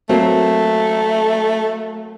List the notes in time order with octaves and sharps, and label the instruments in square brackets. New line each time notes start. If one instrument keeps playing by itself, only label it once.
[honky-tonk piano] F#3 A#3 C4 [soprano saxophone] A3